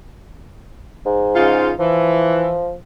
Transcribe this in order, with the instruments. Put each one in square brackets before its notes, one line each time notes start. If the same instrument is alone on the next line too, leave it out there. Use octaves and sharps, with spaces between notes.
[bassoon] G#2
[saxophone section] C#3 D#4 F4
[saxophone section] E3 [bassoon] F3